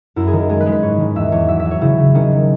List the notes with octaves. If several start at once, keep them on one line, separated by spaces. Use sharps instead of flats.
F#2 E4
G#4
D#3
G#4
G#3 G#4
B4
G#3
B4
G#2 C#5
D#3
E2 E5
E2 C#5
F#3 E5
E5
F#3
C#5
C#3 E4
C#3
D#3 C#4
F#3